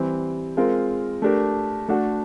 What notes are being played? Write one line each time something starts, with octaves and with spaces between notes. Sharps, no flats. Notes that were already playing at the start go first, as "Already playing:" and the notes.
Already playing: E3 G3 C4
G#3 C4 F4 A#4
A3 D4 G4 A#4
A3 D4 F#4 A4